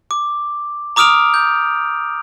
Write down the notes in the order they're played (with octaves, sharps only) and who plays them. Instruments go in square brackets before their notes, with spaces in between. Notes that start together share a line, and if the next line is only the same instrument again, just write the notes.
[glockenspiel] D6
A#5 D6 D#6 F6 D7 F7
G6